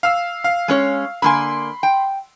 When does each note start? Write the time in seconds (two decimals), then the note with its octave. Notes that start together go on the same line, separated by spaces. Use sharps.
0.03 F5 E6
0.44 F5
0.68 G#3 C#4 C#5
1.22 D3 A#3 G#5 B5 C6
1.83 G5